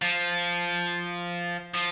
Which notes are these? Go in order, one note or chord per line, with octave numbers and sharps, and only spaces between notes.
F3
F3